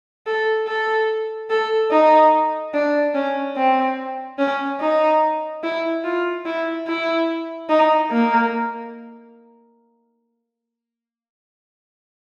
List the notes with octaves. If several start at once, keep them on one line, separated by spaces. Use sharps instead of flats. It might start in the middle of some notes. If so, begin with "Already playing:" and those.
A4
A4
A4
D#4
D4
C#4
C4
C#4
D#4
E4
F4
E4
E4
D#4
A#3